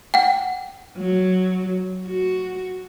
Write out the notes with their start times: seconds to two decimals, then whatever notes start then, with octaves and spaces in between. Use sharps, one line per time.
0.14 F#5 G5
0.98 F#3
2.07 F#4